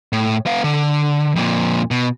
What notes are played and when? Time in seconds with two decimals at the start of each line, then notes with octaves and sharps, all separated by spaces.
0.13 A2
0.46 B3 F5
0.64 D3
1.36 F2 A#2
1.91 B2